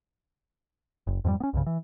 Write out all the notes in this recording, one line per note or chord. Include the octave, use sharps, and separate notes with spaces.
F#1
F2 G#2 F3 G3
B3 C#4
C2 G2 C#3
E3